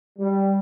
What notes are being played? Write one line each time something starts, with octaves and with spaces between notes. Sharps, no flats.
G3